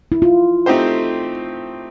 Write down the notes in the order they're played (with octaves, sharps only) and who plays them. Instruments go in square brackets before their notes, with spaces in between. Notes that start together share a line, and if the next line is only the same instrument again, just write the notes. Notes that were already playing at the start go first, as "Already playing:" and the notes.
[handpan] E4
F4
[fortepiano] A3 C4 D#4 G4 C5